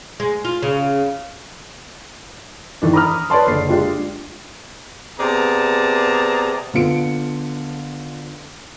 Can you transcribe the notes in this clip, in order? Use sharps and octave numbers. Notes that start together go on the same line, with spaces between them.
G#3
F4
C#3
D#3 E3 D4
A#5 B5 D6 D#6 F6
B4 C#5 D5 A5 C6
F#1 D3 C7
G#3 D4 F4 G4
C3 B3 G#4 D5 A5 A#5
D3 B3 F4 C#7 D7